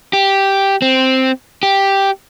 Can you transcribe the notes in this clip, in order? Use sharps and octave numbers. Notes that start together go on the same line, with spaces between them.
G4
C4
G4